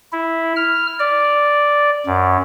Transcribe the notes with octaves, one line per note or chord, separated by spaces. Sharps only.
E4
F6
D5
F#2